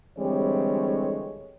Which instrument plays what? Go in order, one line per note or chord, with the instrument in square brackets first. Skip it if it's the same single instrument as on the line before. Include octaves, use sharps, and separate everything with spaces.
[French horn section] D3 E3 G3 G#3 C4 C#5